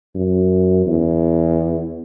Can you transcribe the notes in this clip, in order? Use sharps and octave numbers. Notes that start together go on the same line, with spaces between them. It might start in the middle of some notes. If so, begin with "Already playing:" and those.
F#2
E2